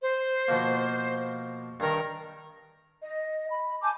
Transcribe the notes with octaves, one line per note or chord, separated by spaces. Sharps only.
C5
B2 F3 A#3
G2 D#3 A#4
D#5
B5
G#5 A5 D6 G6